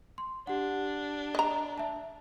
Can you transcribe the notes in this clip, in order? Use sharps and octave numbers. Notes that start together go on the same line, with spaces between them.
C6
D4 G4 F#5
D#5 A#5
E5 A5